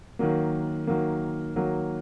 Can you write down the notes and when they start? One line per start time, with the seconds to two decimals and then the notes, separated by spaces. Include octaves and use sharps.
0.19 D#3 F#3 A#3
0.87 D#3 F#3 A#3
1.55 D#3 F#3 A#3